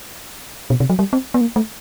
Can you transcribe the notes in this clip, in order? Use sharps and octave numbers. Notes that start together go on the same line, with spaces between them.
B2
C3
F#3
G3
C4
B3
A#3
A3